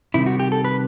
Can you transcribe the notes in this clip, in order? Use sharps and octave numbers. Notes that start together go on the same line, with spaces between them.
C3 D#3 G3 E4
F#4
G4
A4
B4